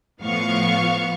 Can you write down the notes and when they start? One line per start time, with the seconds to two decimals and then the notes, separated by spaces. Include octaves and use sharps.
0.23 A2 F3 B3 F5 C#6